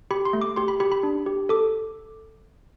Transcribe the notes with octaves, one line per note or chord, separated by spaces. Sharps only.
G4 B5
C6
A3
D6
G4 C6
B5
G4 B5
B5
D4
G4
A4 D6